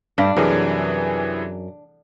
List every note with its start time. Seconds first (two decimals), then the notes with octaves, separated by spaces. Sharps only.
0.18 G2 D4
0.36 F#2 C3 E3 G#4